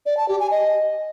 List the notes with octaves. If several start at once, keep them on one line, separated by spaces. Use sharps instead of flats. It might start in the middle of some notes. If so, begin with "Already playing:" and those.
D5
A5
G4
G#5
D#5